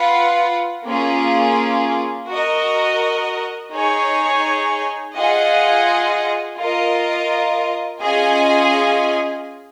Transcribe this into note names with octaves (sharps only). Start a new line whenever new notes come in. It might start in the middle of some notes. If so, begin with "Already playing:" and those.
Already playing: F4 B4 F#5
A#3 C#4 F4 G#4
F#4 A#4 D#5
D#4 G#4 C#5
F4 G#4 D#5 F#5
F4 A#4 D#5
C#4 F4 G#4 D#5 G#5